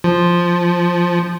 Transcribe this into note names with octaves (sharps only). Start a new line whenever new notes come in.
F3